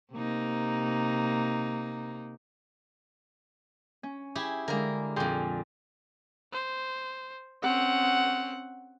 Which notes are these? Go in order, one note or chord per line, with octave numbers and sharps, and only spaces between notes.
C3 A#3 D#4
C#4
E4 G4 G#4
D3 G#3 A#3 A#4
F2 A#2 G#4 G5 C6
C5
C4 C#4 F#5